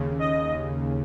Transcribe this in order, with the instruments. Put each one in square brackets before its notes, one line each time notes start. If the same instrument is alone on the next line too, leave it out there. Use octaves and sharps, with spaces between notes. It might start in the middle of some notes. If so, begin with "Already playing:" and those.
Already playing: [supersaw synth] D#2 C#3
D#5